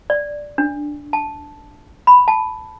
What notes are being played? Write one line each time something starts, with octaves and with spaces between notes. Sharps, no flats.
D5
D4
A5
B5
A5